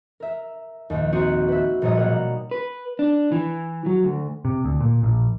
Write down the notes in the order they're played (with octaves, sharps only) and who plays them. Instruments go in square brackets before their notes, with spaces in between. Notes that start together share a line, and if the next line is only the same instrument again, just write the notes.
[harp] A#4 E5
A#1 D#2
C4 D#4 F#4 D#5 F#5
B4 E5
A#1 A#2 G3 C#5 D#5 D#6
B2 G3 A#3 A#4 F#5
[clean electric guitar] B4
D4
E3
F#3
D2
[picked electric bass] C3
D2
A#2
A#1